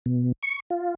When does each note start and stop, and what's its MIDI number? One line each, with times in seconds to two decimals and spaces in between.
0.06 0.32 47
0.43 0.60 85
0.70 0.95 65